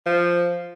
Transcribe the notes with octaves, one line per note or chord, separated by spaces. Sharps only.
F3